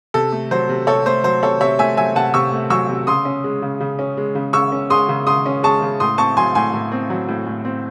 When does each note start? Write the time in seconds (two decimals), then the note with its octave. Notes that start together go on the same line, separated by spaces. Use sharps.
0.14 C3 A4
0.32 A3
0.51 F#3 C5
0.69 C3
0.87 C3 A4 C#5
1.06 A3 C5
1.24 F#3 C5
1.43 C3 A4 C#5
1.61 C3 C#5 E5
1.79 A3 E5 G#5
1.97 F#3 E5 G#5
2.16 C3 F#5 A5
2.34 C3 C#6 E6
2.53 A3
2.70 F#3 C#6 E6
2.89 C3
3.07 C#3 C6 D#6
3.25 C#4
3.44 G#3
3.62 C#3
3.80 C#3
3.99 C#4
4.17 G#3
4.35 C#3
4.53 C#3 C#6 E6
4.72 C#4
4.90 G#3 C6 D#6
5.08 C#3
5.27 C#3 C6 D#6
5.46 C#4
5.63 G#3 A5 C#6
5.82 C#3
6.00 A2 C6 D#6
6.18 C4 A5 C#6
6.37 F#3 G#5 C6
6.55 A2 G#5 C6
6.74 A2
6.92 C4
7.10 F#3
7.28 A2
7.47 A2
7.65 C4